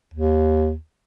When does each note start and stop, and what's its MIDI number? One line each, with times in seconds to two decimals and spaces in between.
0.14 0.75 39